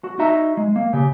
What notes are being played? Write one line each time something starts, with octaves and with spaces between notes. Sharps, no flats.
F#4
D#4 F#4 D#5 E5 A#5
G#3
A#3
C#3 G4